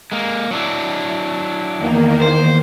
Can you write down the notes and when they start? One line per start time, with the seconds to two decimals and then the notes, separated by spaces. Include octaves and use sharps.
0.12 G#3 A#3
0.51 F#3 D4 E4
1.78 E2 D#3 A#3
2.22 C5